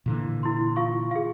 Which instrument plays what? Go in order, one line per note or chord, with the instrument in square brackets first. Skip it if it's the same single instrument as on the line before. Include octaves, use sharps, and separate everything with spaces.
[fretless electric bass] A#2 D3 E3
[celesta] E4 C6
F4 F5 C#6
G#4 F5